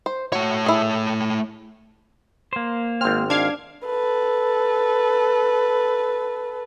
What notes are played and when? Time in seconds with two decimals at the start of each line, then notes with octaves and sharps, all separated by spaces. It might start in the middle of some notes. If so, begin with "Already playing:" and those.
0.06 C5
0.32 A3 F#4 C#5
0.66 E4 G#4
2.53 A#3 C5
3.01 G#1 C4 F6
3.30 D4 F5 G#6
3.85 A4 B4